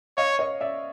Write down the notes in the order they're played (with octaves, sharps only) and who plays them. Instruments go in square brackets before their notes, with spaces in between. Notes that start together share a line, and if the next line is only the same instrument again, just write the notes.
[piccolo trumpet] C#5 [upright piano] D#5 F5
[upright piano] C#5 D#5
D5 E5